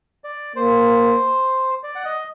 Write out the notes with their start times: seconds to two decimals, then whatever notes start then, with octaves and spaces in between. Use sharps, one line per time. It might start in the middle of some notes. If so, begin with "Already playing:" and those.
0.24 D5
0.56 A#3 C5
1.83 D5
1.95 F#5
2.05 D#5